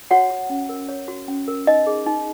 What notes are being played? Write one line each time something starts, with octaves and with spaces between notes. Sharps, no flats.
F#4 C#5 F#5
F#4
C#4
A#4
C#5
F#4
C#4
A#4
D#4 D#5
G#4
D#4